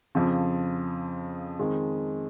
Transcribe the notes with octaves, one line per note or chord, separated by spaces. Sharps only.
F2 C#3 F3
F2 D#3 G#3